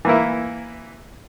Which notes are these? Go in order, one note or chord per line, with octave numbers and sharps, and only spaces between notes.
E3 A#3 E4